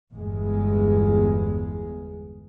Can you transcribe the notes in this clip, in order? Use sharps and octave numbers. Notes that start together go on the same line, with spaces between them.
G1 E2 G#3